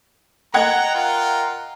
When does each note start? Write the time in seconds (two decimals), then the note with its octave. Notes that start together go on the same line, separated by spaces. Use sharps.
0.54 D#5 F#5 G5 A#5 G#6
0.95 F4 A#4